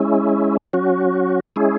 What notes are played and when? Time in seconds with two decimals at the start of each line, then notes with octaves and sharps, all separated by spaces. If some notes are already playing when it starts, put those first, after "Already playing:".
Already playing: G#3 C#4 E4
0.73 F#3 C#4 F#4
1.56 G#3 C#4 E4 G#4